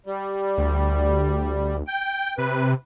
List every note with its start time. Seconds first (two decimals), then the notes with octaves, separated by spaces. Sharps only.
0.06 G3
0.57 D2
1.87 G5
2.38 C3 B4